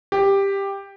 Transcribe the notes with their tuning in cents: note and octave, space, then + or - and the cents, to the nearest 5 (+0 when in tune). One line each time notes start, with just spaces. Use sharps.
G4 +10